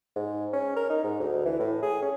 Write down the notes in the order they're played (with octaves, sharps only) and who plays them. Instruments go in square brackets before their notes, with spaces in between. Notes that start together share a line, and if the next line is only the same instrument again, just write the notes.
[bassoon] G#2
C#4
A#4
D#4
G#2
D2
E3
A2
G#4
C#4